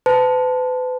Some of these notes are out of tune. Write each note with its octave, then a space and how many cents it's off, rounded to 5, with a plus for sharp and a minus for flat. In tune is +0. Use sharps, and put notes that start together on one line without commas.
B4 +40 A5 +0